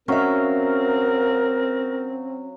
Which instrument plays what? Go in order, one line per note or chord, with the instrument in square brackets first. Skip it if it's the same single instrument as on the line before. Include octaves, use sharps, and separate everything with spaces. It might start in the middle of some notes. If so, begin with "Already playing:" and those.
[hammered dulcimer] F#3 F5 C#6 [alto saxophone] C4 [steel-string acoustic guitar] C#4 E5 [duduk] A#4